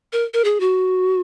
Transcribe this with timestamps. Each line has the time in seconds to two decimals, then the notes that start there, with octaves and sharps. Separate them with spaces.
0.13 A#4
0.34 A#4
0.44 G#4
0.60 F#4